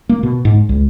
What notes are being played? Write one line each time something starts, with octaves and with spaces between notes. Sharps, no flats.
A#3
B2
G#2
C#2